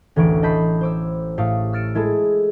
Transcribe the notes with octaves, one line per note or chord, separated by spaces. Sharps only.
A1 D2 E3 C#6 D7
D#5 A5 B5 G6 B6 C7
C5 D6 E6
A2 A3 G4 F5 D#6 C#7
E6 F6 A6 C#7 D7 E7
G#3 E4 G#4 A4